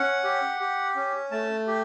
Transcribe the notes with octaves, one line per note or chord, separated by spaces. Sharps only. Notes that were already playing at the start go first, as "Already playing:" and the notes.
Already playing: C#4 F#5
G4
G4
C#4
A3 A5
G4